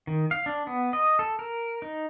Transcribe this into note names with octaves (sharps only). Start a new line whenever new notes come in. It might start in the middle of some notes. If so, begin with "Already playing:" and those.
D#3
F5
D4
B3
D#5
A4
A#4
D#4